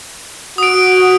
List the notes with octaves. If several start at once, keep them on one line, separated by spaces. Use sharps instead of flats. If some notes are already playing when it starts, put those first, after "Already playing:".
F#4 D#6 D7